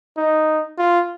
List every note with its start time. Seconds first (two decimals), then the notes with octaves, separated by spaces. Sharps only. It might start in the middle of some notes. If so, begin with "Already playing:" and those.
0.17 D#4
0.78 F4